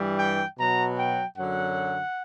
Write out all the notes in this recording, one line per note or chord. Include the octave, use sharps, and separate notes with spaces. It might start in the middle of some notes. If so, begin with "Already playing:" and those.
Already playing: G2 E3 G3
G5
B2 F#3 A#5
G5
F#2 D3 F#3 F#5